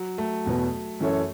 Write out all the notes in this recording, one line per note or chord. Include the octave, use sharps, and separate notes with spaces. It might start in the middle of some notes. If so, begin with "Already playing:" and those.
Already playing: F#3
A3
E2 B2 F#3 B3
F#2 E3 C#4 A4 C#5